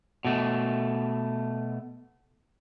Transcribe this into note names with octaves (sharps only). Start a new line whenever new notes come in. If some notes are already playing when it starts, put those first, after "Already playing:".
B2 A3